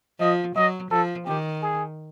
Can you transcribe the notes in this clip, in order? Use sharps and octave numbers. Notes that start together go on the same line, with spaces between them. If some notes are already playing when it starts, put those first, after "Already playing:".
F3 D#5
F#3 D#5
F3 A4
D#3 G4
G#4